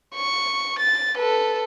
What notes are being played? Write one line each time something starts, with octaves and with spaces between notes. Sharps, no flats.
C#6
A6
A4 B4